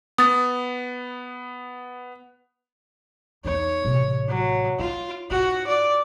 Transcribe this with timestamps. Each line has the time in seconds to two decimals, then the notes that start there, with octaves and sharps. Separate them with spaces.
0.18 B3 D#6 A6
3.45 E2 D#4 C#5
3.85 A1 C3
4.28 F#3
4.79 E4 F4
5.31 G#2 F4 F#4
5.67 D5